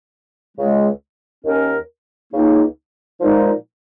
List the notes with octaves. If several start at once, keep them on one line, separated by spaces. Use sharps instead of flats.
C#2 C#3 G#3
D#2 D#3 C#4 A#4
C#2 C#3 A#3 D#4
A#2 F3 G#3 D#4